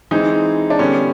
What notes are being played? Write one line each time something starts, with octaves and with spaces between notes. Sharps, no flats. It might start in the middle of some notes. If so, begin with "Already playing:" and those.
E3 G#3 C4 D#4 E4
D4
D3 G3 B3 C#4